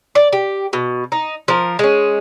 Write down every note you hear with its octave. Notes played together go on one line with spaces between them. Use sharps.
D5
G4
B2
D#4
F3 A#4
G#3 C#4